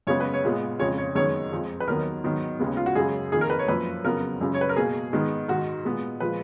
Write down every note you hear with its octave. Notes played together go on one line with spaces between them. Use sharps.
F#2 C#3 G#3 B3 C#5
B4
C#5
A#2 G#3 B3
F2 C#3 G#3 C#5
C#5
F#2 D#3 G#3 B3 C#5
F2 F3 G#3
B4
D#2 D#3 F#3 B3 A#4
G#2 D#3 F#3 B3
D#2 C#3 G#3 B3
F4
F#4
F#2 C#3 G#3 G#4
F2 D#3 A#3 G#4
A#4
B4
C#5
F#2 F3 A#3 B4
F2 C#3 F#3 B3 A#4
F#2 C#3 G#3
C#5
B4
A#4
B2 A#3 G#4
G#2 D#3 G#3 B3
G#2 D#3 G#3 F#4
A#2 G#3 B3
A#2 F3 G#3 B4